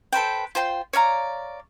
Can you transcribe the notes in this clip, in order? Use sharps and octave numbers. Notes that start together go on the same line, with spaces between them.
A4 B4 C5 G5
F4 C5 G5 C6
C#5 D5 F5 A#5